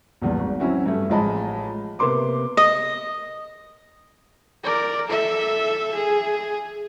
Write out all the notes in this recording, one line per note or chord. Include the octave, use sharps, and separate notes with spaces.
A#1 E2 G2
G#1
F#3 C4 C#4 E4 F#4
G2 A3
A1 F3 G#3 D#5 A5 B5
C3 A#3 B3 C6 D6
D#5
A#4 D5
A4 E5
G#4